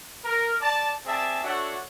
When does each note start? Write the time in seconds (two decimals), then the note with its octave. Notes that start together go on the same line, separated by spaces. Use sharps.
0.24 A#4
0.60 D5 A5
1.06 C4 G#4 D5 E5 A5
1.43 D4 F#4 A4 C#5 E5 F#5